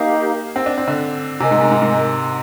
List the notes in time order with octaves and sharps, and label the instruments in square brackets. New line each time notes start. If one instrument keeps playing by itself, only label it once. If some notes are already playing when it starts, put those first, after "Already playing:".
Already playing: [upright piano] A#3 [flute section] D#4 G4 A#4 F5
[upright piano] C4
D4
C4
D3
[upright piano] C3 [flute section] A#4 D#5 G#5
[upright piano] G#2
G#2
G#2
G#2